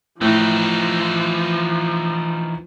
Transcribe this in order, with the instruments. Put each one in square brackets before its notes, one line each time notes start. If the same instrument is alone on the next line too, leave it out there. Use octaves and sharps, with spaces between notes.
[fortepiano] A2 [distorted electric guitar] E3 D#4 [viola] F3